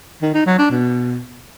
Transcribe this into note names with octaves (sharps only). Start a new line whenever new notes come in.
D#3
D#4
F#3
D4
B2